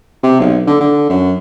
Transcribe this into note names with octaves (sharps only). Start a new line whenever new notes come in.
C3
B1
D3
D3
F#2